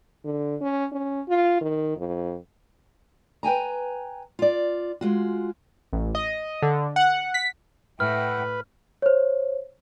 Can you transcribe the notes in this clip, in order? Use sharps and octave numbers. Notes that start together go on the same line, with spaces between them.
D3
C#4
C#4
F4
D#3
F2
B4 G5 G#5 A#5
F4 D5
G#3 F4 F#4
A1
D#5
D3
F#5
B6
A2 B4 E5 F#5 G5 F6
C5 C#5